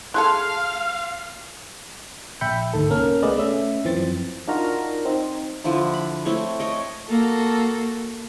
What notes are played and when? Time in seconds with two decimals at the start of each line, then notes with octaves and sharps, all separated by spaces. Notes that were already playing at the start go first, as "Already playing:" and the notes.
0.14 E4 G#4 A4 F5 C6 F#6
2.41 A#1 E5 G5 B5 G6 C#7
2.73 G#1 D2 D#3 A4
2.90 C2 A#3 C#4 A#4 F6
3.22 A3 B3 G#4 B4 D5 D#5
3.36 A3 C#4 E5
3.84 F#2 E3 F3 C4 A6
4.48 D4 D#4 F4 F#4 A#4 A#5
5.05 C4 D#4
5.64 D3 F3 D4 E4
5.93 B5
6.25 A3 C4 E4 C#5
6.59 C#5 D#5 G5
7.08 A#3 F#4 A4